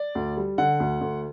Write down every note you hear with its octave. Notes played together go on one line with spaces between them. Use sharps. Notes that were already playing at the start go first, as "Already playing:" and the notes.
Already playing: D5
D2
G3
D3 F#5
D2
D2